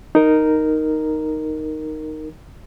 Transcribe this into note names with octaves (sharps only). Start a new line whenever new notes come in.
D#4 A#4